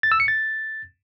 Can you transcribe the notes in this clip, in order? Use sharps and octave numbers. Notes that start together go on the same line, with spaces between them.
A6
E6
C#7
A6